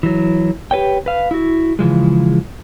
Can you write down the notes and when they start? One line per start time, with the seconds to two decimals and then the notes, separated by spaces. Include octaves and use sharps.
0.03 E3 F#3
0.71 G4 B4 C#5 G5
1.06 B4 F5
1.31 E4 F#4
1.79 C#3 E3 F3 G#3